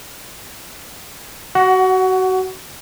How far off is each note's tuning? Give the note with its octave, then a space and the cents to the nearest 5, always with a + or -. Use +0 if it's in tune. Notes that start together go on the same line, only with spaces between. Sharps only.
F#4 +25 F#5 +0